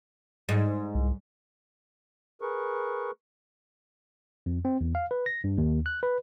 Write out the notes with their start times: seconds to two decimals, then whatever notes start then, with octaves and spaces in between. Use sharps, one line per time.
0.49 G#2
0.95 C2
2.41 G#4 A#4 B4 C#6
4.46 F2
4.65 C4
4.81 E2
4.95 F5
5.11 B4
5.26 A#6
5.44 G2
5.58 D#2
5.86 F#6
6.03 B4